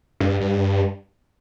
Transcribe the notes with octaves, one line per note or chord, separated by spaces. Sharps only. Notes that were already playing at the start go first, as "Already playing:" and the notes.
G2
G2
G2